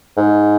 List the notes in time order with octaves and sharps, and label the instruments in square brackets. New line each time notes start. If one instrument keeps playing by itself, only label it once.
[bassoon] G#2